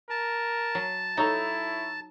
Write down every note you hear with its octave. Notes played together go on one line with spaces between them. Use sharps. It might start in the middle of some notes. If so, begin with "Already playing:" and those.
A#4 A5
F#3
D#4 E4 A4 C#5 A#5